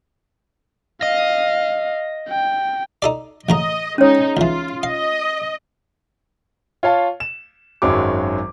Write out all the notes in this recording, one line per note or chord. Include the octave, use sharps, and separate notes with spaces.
D#5 F5
G5
D#4 A4 D5
A1 C#3 D#5 A#5
G#3 C#4 D#4 C#5
C#2 E3 F4
D#5 F5
F4 C#5 F5 A5
E7
G#1 F#2 D#3 F#3 G#3 D6